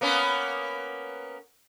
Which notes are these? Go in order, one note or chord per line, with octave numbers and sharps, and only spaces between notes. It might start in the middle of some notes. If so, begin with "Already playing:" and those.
A#3 B3 C#4